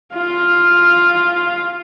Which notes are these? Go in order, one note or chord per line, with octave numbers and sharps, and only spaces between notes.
F4 F5